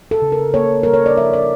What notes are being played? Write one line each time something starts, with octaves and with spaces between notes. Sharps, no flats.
A4
C#3
A#4
A#3 C#5
G3 A#4
C#5
D5
F3 E5
D5